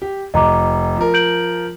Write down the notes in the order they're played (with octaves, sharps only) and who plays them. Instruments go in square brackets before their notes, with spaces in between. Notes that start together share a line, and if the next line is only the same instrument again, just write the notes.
[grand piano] G4
[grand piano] F1 [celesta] D#5 A#5 D6
[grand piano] F3 A#4
[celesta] G6 D7 F#7